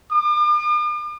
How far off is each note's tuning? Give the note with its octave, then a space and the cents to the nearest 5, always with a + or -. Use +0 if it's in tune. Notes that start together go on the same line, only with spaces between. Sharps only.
D6 +45